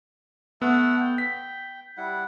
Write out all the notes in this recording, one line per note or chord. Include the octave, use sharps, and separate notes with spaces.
A3 B3 F#5 E6
G5
B6
G3 E4 F#5